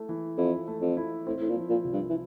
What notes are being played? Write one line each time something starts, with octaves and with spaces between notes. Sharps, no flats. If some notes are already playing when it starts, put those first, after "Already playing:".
Already playing: A3 E4
E3
F2 E4
A3
F2
E4
A2 C4
A2
A#2
F3
A#2
C2
G2
E3